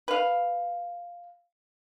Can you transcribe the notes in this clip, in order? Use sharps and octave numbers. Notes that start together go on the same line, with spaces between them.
B4 F5